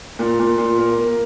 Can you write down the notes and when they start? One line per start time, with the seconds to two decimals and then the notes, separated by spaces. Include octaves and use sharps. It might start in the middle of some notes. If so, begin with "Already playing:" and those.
0.19 A#2
0.39 A#2
0.58 A#2
0.78 A#3
0.98 A#3